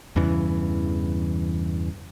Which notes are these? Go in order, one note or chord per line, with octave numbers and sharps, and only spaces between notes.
E2 G2 C#3 E3